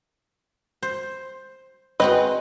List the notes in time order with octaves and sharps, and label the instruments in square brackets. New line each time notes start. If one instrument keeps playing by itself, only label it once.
[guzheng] C5
[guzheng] G#3 C4 F#4 [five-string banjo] B4 D#5